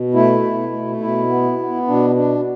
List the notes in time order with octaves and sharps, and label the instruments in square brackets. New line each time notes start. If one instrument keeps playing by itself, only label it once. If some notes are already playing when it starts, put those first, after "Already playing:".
Already playing: [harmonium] B2
A3 E4
B2
A3
B2 E4
B3
B3
B2 D4
D4